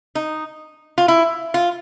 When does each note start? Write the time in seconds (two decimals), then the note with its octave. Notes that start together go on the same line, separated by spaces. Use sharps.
0.15 D#4
0.98 F4
1.08 E4
1.54 F4